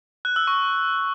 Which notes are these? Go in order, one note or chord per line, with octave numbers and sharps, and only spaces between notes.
F#6
E6
C#6